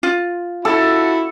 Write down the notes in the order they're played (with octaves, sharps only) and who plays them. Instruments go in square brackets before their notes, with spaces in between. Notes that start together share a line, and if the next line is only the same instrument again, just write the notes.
[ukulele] F4
[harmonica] E4 F#4 [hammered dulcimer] A4